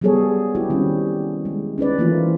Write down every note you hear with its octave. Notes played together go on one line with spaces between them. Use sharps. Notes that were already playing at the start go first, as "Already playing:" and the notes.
F#3 G3 B3 G#4 A4 C#5
E4 F#4 G4
D#3 G3 C4 C#4
G#3
C#4 D#4 B4 D5
E3 F3 A3 A#3 D#4 F4